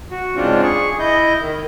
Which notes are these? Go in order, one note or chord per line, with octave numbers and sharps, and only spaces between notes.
F#4
G#2 C#3 C4 D4 F4
G#4 C#6
E4 D#5 G6
D#3